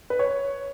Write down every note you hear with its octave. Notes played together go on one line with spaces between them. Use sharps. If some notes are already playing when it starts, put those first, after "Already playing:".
B4
C#5